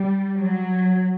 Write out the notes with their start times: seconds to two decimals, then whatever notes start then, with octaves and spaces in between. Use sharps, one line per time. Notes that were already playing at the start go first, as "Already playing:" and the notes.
Already playing: G3
0.37 F#3